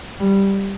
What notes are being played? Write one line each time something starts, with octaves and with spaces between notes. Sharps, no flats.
G3